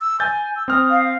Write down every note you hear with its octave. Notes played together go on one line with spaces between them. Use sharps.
E6
G#5 G6 A6
E6
C4 D#6 F6
F5